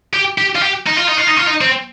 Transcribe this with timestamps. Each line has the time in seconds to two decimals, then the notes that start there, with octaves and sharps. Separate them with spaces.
0.14 G4
0.38 G4
0.56 F4
0.62 G4
0.87 D#4
0.97 F4
1.08 D#4
1.18 F4
1.28 D#4
1.37 F4
1.47 D#4
1.61 C4